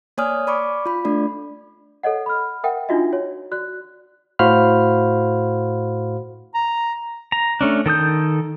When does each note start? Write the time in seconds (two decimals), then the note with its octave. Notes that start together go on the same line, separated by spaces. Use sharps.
0.18 A#3 C#5 D5 G#5 D#6 F6
0.47 D5 B5 C#6 D6
0.86 F4 B5
1.05 A3 D4 D5
2.03 A4 C#5 D#5 F#5
2.26 B5 F6
2.64 A#4 E5 F#5 G5
2.89 D4 D#4 F4 F#4 D#5 E5
3.13 F#4 C#5
3.52 F#4 D5 F#6
4.39 A2 F#4 C5 F5 B5 F6
6.55 A#5
7.32 A#5
7.61 A3 C#4 D4
7.86 D#3 A4 D#6 G6